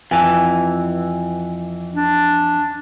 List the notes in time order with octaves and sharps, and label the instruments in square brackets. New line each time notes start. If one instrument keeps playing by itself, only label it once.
[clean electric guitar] F2 E3 [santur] G#5
[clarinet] D4